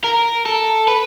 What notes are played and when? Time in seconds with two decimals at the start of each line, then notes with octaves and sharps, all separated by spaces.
0.04 A#4
0.46 A4
0.88 B4